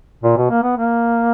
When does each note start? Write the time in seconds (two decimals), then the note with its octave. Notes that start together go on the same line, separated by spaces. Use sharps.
0.24 A#2
0.37 B2
0.50 A#3
0.63 B3
0.77 A#3